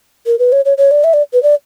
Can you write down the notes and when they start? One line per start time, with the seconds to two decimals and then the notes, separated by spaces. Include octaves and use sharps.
0.26 A#4
0.39 B4
0.52 C#5
0.65 C#5
0.78 C#5
0.91 D5
1.04 E5
1.14 D5
1.33 B4
1.43 D5